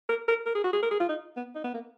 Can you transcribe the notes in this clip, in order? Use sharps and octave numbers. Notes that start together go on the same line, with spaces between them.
A#4
A#4
A#4
G#4
F#4
G#4
A#4
G#4
F4
D#4
B3
D#4
B3
A#3